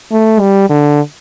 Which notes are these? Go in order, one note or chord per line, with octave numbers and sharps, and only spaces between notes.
A3
G3
D3